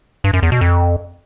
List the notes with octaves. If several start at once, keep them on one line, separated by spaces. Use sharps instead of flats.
G2
F#2
E2
B2
F2